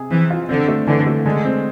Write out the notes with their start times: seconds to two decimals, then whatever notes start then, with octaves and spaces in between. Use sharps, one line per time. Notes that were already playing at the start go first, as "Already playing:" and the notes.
Already playing: C3 G#4
0.11 E3 C4
0.30 F4
0.49 D3 C4
0.68 A3
0.87 D3 E3
1.07 A3
1.26 D3 G#3
1.45 C4